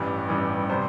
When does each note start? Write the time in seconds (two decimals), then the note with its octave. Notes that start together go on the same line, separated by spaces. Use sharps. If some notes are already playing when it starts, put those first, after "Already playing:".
Already playing: A1 G2 E3 G3
0.29 A1 G2 E3 G3
0.69 C3 G3 C5